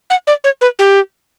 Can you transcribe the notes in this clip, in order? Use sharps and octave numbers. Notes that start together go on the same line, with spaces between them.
F#5
D5
C#5
B4
G4